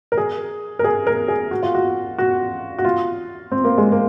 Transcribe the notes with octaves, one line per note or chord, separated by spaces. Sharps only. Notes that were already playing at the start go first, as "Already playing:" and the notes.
A#4
G#4
A#4
G#4
A#4
G#4
F#4
F4
F#4
F#4
F#4
F4
C4
A#3
G#3
A#3